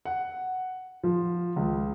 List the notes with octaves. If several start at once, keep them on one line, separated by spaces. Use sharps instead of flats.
F#5
F3
C#2